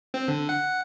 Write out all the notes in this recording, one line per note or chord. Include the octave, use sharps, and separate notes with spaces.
C4
D3
F#5